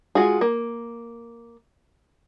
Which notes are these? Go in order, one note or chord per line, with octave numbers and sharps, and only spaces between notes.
G#3 F4 F#4 G#4
A#3